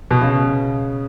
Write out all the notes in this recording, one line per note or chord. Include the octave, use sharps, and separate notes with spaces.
B2
C#3